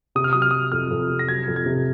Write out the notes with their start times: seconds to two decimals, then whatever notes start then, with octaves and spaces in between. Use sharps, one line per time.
0.15 C3 D#6
0.24 F6
0.33 F#3 D#6
0.42 F6
0.51 F#3 D#6
0.72 F2 F6
0.91 F2
1.09 C3
1.19 A#6
1.28 F#3 G#6
1.47 F2
1.56 G#6
1.66 C3